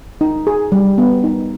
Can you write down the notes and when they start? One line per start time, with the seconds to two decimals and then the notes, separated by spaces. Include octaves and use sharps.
0.21 D#4
0.47 G#4
0.72 G3
0.98 B3
1.24 D#4